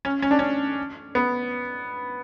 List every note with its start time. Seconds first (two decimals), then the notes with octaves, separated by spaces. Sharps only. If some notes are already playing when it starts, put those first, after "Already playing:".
0.05 C#4
0.22 C#4
0.31 D4
0.39 C#4
1.15 B3